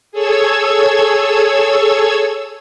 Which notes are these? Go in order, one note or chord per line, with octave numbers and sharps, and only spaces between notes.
G#4 A4 C#5 E6 G#6